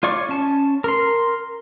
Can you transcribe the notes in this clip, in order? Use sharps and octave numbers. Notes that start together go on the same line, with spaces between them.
F4 C#5 D5 C#6
C#4 A5
A#4 C6